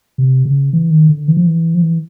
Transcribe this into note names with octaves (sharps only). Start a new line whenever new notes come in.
C3
C#3
E3
D#3
D3
E3
F3
E3
F3
E3